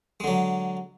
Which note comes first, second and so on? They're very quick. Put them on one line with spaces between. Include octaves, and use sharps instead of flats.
G#3 D3 F#3